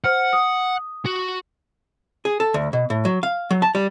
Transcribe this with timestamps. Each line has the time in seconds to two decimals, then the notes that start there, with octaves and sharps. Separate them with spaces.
0.04 C5 F#5 F6
0.33 D#6
1.06 F#4
2.25 G#4
2.40 A4
2.54 D2
2.73 B2
2.90 A2
3.05 F#3
3.23 F5
3.51 F#3
3.62 A5
3.75 G3